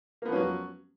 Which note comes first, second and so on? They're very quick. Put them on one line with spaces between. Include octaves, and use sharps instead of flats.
A#3 B3 F3 C#4 F#3